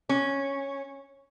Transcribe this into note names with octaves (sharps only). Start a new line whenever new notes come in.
C#4